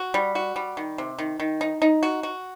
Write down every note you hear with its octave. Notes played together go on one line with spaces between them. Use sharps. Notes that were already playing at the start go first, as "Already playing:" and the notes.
Already playing: F#4
G3
F#4
G3
D#3
C3
D#3
D#3
D#4
D#4
F#4
F#4